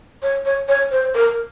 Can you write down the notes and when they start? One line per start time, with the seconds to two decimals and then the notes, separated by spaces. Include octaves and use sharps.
0.23 C#5
0.46 C#5
0.68 C#5
0.91 C5
1.15 A#4